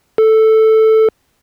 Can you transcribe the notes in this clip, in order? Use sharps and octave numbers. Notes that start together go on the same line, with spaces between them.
A4